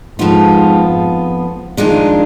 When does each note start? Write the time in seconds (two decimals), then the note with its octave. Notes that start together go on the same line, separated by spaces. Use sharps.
0.19 F2 G#2 F3 B3 F4
1.77 F2 D#3 G#3 D4 F4